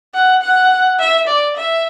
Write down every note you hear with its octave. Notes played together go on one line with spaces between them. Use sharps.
F#5
F#5
E5
D5
E5